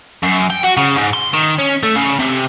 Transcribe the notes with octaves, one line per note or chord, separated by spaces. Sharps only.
F#2
G5
F#4
C#3
G#2
C6
D#3
C#4
A3
C#3
C3